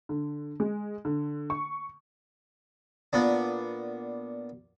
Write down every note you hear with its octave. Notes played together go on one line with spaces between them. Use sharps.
D3
G#3
D3
C#6
A#2 B3 D4